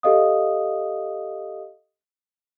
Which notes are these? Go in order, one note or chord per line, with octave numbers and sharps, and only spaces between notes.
G4 A4 D#5 F5 D#6